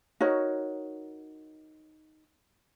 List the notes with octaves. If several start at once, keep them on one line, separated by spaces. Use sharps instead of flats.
D#4 F#4 A#4 C#5